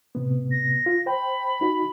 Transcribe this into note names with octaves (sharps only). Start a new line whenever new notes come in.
A2 C3 B3
A#6
F4
C5 G5 B5
D#4 F#4